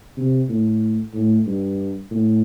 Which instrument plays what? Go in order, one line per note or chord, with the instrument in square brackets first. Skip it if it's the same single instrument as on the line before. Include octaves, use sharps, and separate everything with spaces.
[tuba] C3
A2
A2
G2
A2